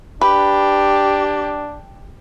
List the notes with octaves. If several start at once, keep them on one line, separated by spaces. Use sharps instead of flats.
D4 G4 B4